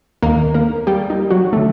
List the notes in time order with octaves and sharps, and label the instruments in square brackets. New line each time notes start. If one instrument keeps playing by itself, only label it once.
[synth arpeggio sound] D#2 D#3 A#3 A#4
A#3 A#4
G3 G4
D#4
F#3 F#4
D3 A3 A4